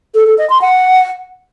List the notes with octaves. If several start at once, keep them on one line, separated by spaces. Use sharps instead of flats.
A4
A4
D#5
C6
F#5